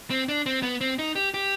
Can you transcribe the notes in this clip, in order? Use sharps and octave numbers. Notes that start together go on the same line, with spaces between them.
C4
D4
C4
B3
C4
D#4
G4
G4